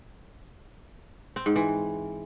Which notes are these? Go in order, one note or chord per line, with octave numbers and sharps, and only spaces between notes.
C4
G#2
E3